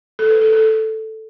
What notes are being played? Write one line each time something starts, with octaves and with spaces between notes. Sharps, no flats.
A4
B4
A4
A4